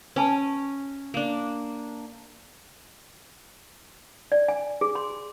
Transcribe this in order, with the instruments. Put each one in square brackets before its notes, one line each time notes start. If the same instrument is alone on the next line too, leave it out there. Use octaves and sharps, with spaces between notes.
[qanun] C#4 [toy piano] B4 G#5 A5
[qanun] A#3 D4
[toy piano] D5
G#5
G#4
C6